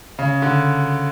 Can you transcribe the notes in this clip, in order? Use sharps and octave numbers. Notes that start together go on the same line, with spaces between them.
C#3
D3